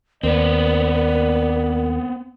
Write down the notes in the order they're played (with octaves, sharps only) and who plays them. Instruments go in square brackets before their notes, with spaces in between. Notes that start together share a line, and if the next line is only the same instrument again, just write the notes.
[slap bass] D#2 [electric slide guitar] B3 C4 [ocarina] A#4 [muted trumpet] D5